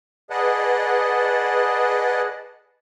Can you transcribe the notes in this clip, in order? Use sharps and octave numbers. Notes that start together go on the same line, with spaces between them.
G#4 B4 D5 D#5 F#5 A5